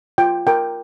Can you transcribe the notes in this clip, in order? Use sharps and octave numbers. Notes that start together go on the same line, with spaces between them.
F4 G5
A#4 G5